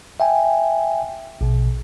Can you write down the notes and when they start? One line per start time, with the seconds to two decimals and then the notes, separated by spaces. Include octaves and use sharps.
0.20 E5 G5 G#5
1.41 A#1 B2